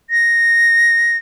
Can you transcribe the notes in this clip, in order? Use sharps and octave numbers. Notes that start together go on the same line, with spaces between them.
A#6